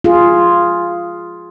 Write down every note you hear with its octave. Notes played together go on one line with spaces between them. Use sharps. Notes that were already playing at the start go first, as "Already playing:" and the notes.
F4 G#4